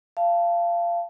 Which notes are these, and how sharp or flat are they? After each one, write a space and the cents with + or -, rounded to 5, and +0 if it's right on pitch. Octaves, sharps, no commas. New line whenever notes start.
F5 -25 A5 +0